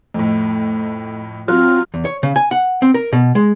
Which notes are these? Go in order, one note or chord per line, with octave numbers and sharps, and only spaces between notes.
F2 A2 A3
F#3 C4 F4 F6 F#6
E2
C#5
C#3
G#5
F#5
C4
A#4
B2
G#3